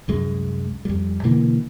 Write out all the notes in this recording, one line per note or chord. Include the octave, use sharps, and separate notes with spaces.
C2 F#2 G#3
F2 G3
B2 D3 E3 A#3